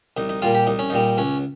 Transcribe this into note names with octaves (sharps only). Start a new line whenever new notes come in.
C2 D#4
D#4
A#2 G3 F4
G4
C2 D#4
C#4
A#2 G3 D#4
C#2 C#4